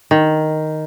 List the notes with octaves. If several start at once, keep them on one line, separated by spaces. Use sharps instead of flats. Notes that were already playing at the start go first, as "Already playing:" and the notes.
D#3